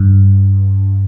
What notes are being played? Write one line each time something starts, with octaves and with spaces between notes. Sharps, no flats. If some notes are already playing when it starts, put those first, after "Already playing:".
Already playing: G2